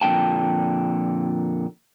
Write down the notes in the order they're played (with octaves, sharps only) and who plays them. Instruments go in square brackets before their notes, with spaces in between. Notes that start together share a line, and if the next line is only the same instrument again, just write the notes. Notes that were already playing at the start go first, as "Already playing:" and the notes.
[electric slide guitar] F2 A#2 D3 G5 A5